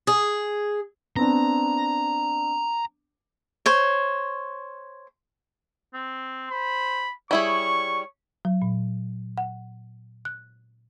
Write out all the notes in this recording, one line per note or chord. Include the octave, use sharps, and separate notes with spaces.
G#4
B3 C4 D4 A#5
C5 C#5
C4
C5 B5
G3 E4 G#4 C#5 C#6
F#3
A#2
F#5
F#6